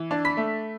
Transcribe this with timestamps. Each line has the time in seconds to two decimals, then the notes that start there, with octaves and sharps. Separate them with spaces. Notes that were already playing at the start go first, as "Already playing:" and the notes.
Already playing: E3
0.11 D4
0.25 B5 B6
0.37 A3